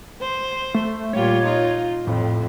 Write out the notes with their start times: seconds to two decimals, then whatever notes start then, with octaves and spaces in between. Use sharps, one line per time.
0.21 C5
0.75 A3
1.13 A#2 G3 F4 C#5
1.44 D#4 F4
2.07 F2 A2